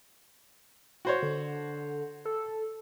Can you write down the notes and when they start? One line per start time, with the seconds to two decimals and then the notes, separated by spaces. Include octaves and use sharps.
1.05 F#4 C5 C#5
1.23 D3
2.25 A4